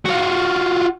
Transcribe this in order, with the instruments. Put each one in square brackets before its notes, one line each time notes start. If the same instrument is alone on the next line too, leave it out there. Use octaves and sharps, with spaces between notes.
[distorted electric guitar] F4 F#4